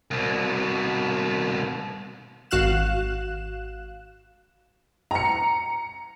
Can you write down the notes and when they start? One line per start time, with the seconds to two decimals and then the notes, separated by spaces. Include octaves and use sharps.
0.11 C2 B2
2.51 G#1 F#4 F5 F#6 E7
5.11 A#5 C#7